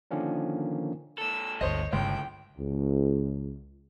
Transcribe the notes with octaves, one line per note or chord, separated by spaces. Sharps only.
D3 D#3 F3 A#3 C#4 D4
A#2 A4 E6
G1 D2 C5 C#5 D#5
G1 C#2 A2 G5
C#2